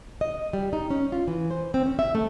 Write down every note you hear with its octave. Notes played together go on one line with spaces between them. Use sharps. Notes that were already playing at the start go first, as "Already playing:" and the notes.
D#5
G3
D#4
C#4
F4
E3
C5
C4
C#4
E5
A3